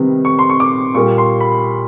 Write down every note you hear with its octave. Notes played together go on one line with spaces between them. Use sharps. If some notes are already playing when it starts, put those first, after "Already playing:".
Already playing: C3 D#3 G3 B3
C#6
C6
C#6
D6
A#2 G3 A#3 C#6
C6
B5